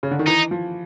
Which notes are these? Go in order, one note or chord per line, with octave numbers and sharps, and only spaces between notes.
C#3
D3
D#3
E3 D#4
F3